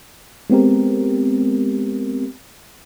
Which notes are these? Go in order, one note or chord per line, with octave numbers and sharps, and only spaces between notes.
G#3 B3 C4 G4 A#4